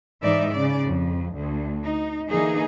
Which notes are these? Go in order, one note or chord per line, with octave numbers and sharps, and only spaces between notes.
G#2 E3 D#4 D5 E5
C#3 D5
F2
D2
D#4
D3 E3 A#3 D#4 G#4